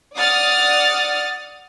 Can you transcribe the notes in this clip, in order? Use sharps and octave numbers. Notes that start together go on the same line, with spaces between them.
D5 F#5 D#6 F6 A6